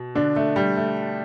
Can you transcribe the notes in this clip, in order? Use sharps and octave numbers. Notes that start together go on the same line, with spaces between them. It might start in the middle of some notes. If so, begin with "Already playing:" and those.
Already playing: B2
D3 D4
A3
G3
A3